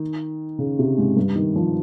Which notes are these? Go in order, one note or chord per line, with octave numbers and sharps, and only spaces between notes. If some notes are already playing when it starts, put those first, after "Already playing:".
Already playing: D#3
C#3
C3
G#2
G2
D#3
F3